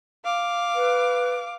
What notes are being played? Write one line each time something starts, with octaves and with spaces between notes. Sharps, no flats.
F5 D6
B4